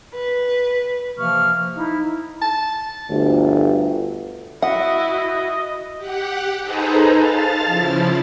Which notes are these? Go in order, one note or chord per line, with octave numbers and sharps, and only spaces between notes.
B4
C3 E3 F3 A#3 C#6 F6
D#4 E4
A5
G1 D2
E4 F#4 D#5 E5 F#5
G4 F#5
D#4 G#4 A4 B4 C5 A#5
F5 A5 F6 A6
C#3 F3 E4